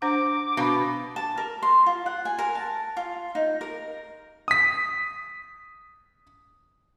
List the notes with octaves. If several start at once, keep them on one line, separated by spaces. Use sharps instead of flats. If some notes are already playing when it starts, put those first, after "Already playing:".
D4 C5 F#5 D6
B2 D4 F5 B5
A5
A#4
C6
F4
F#5
G#5
A#4
A5
F4
D#4
A#4
D#6 B6